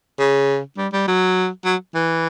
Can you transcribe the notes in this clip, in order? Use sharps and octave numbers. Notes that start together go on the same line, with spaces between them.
C#3
G3
G3
F#3
F#3
E3